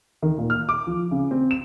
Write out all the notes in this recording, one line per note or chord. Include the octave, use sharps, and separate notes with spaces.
D#3
A#2
F6
D6
F3
C#3
C4
E7